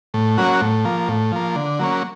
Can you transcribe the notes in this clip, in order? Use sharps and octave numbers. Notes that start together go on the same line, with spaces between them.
A2
F#3 A#3 C#4 F#4
A2
F3 A#3
A2
F3 A#3
D3
F#3 A#3 C#4